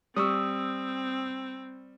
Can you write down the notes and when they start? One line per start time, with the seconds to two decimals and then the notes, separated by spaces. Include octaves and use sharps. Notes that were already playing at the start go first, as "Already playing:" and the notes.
0.16 G3 C4 C#6 D#6 E6